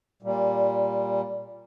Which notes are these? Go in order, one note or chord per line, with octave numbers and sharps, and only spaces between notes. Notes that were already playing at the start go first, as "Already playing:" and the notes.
A#2 G3